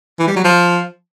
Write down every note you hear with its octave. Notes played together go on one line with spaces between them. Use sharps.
E3
G3
F#3
F3